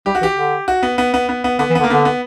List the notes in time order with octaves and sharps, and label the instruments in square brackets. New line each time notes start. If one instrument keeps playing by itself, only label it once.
[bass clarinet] G3 [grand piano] G4
[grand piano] F#4
[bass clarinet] E3 [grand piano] G4
[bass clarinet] D3
[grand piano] F#4
B3
B3
B3
B3
B3
[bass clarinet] D3 [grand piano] B3
[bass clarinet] E3
[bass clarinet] D3 [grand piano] B3
[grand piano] A#3
[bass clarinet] D3 [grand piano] B3
[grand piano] B3